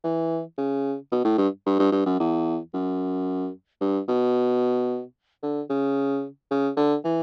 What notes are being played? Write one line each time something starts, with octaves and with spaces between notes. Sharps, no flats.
E3
C#3
B2
A2
G2
G2
G2
G2
F#2
E2
F#2
G2
B2
D3
C#3
C#3
D3
E3